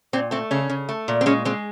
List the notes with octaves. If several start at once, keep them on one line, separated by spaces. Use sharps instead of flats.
A#2 C4
A3 C4
C#3 C#4
C#3
A3
A#2
C4
G#3 C#4
G#3 C4